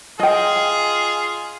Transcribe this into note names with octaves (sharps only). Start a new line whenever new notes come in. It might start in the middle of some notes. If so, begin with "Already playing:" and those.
F4 G#4 D#5 G5